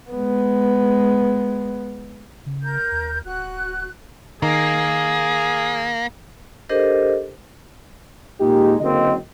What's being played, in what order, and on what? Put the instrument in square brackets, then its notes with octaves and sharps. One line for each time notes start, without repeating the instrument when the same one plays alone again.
[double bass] G#3 B3
[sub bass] C#3
[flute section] A#4 G6
[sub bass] D#2
[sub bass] D1 [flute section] F#4 F#6
[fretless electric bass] D#3 [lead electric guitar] A#3 [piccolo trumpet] G#4
[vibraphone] D4 G4 A4 A#4 C5 D#5
[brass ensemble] A#2 G#3 D#4 G4
F#1 D3 F#3 A#3 C4 D#5